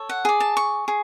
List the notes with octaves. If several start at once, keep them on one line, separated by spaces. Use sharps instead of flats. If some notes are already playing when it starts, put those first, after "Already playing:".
Already playing: A4 C#5
F#5
G#4 D5
A5
C#6
G#4